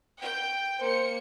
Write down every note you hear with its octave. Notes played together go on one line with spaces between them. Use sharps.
G5
A#3 C5 C#7